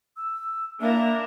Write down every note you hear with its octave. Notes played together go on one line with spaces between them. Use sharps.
E6
A#3 D4 E4 A#4 E5